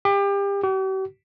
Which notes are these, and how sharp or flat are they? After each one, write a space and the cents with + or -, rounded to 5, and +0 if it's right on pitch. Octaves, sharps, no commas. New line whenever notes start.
G4 +30
G4 -45